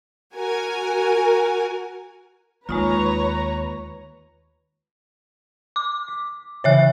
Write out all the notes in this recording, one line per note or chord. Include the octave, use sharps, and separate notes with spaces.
F#4 A#4 G#5
D#2 G#3 D#4 F4 B4 C#5 A#5
D6
B6
C#3 E3 C#4 C#5 E5 F#6